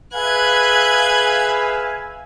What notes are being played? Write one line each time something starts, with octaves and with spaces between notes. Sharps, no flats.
G#4 B4 E5 F5 G#5 F#6 G#6